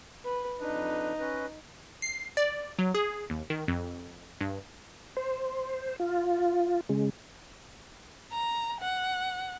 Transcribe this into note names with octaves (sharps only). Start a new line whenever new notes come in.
B4
F2 D4 D#4 B4
C#4 B4 D#5
C7
D5
F#3
G#4
D#2
D#3
F2
G2
C5
F4
C#3 G#3
A#5
F#5